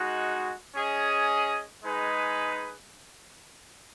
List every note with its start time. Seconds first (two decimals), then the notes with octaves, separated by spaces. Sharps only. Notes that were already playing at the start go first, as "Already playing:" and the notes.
Already playing: G#3 D#4 F#4
0.75 C#4 G#4 D#5
1.85 G#3 D#4 G#4 B4